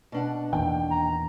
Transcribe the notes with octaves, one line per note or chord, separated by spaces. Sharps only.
B2 D4 F#5
E2 A#2 D#3 G5
A#5